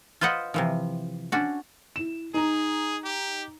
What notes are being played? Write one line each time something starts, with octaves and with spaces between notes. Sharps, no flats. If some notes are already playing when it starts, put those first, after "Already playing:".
F4 B4 C5 D#5 F#5
C3 E3 F3
C#4 D4 F#4
E4 E7
D#4 G#4 A#5
G4